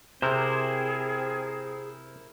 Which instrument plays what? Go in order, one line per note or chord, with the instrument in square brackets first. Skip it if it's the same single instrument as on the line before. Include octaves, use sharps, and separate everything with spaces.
[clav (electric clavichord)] C3 [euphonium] C4 [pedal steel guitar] E4 A#4 C5 [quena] G#4